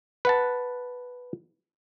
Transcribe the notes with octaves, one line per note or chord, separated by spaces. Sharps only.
B4 F#5 A5